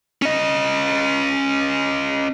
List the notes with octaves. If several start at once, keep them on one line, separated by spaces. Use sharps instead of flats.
C#4 D#5